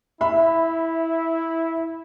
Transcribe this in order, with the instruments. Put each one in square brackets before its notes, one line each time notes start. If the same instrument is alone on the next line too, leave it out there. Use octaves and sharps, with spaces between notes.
[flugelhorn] E4 [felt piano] E5 B5